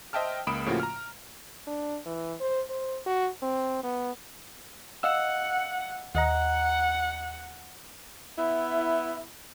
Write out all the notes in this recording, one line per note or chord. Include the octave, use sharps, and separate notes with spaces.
C5 D#5 E5 G5 A5 F6
C#2 A#3 B5 D#6 D7 E7
A2 C#3 F3 A#3 F4 F#4
A#5 F6
D4
E3
C5
C5
F#4
C4
B3
D#5 F5 F#5 E6
D#2 D#5 F#5 A#5
B3 E4